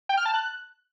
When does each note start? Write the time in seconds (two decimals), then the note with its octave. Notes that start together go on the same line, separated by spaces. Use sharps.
0.09 G5
0.17 F6
0.25 A5
0.34 F#6